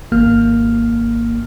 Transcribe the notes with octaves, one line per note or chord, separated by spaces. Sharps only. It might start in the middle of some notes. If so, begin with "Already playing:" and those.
G#1 A#3 F6